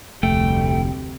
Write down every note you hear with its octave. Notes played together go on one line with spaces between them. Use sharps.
F1 D2 C3 G3 A3 G5